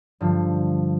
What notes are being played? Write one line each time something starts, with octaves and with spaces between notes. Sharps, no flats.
G2 D3 F3